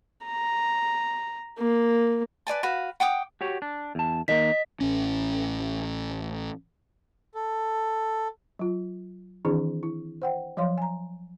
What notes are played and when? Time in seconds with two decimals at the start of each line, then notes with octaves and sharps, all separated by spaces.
0.25 A#5
1.59 A#3
2.47 B4 D5 G#5 A5
2.63 F#4 B4 F5
3.00 F#5 G5 D6 D#6
3.41 F#4 G4 C#5
3.62 D4
3.95 E2 A5
4.28 D#3 G#3 A#3 D#5 B6
4.80 A1 C#4
7.35 A4
8.59 F#3 F4
9.45 D#3 E3 C4 D4 E4 G#4
9.83 E4
10.22 C5 F#5 G5
10.57 F3 F#3 C#5 F5 C6
10.78 G#5 A#5